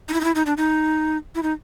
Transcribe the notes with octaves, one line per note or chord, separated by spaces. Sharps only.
D#4
E4
D#4
E4
D#4
D4
D#4
E4
D#4